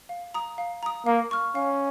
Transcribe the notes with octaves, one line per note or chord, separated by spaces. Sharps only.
F5
A#5 D#6
F5
A#5 D#6
A#3 F5
C#6 F6
C#4 F5